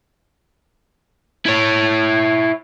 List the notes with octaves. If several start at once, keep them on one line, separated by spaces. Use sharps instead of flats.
E4 C#5